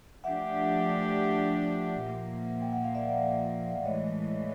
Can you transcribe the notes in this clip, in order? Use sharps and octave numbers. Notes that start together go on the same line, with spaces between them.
F3 A3 D4 G4 E5 F#5
A#2 F3 A#3
G5
F#5
F5
D5 E5
A2 E3 G#3 C#5 D#5